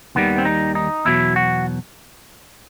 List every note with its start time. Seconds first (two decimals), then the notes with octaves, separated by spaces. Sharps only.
0.15 D#2 D#3 G3 B3
0.38 C4
0.45 D#4
0.75 D#4
1.05 E2 B2 F#3 E4
1.36 F#4